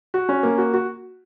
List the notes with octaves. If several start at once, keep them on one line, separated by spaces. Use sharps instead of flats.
F#4
C#4
A#3
F#4
F#4